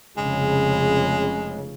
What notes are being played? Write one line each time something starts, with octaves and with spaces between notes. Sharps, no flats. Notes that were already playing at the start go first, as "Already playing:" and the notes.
F1 C#3 G#3